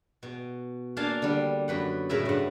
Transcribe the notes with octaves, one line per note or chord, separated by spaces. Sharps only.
B2
A#3 D4 F5 G#5 A5
D3 G3
F#2 B4 F#5
A2 C#3 A#4 B4 E5 G#5
G2 F#5